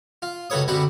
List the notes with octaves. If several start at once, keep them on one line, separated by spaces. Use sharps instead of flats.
F4
C#2 F#2 A4 B4 C#5 D#6
F#2 D3 G3 C4 F#5 B5